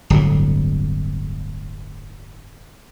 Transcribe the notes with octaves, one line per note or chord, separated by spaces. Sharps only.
D1 G1 A2